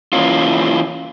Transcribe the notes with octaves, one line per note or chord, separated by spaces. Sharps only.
E3 A#3 C#4 F4